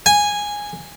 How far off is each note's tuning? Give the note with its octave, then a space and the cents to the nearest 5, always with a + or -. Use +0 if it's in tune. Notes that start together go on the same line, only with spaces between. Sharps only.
G#5 -10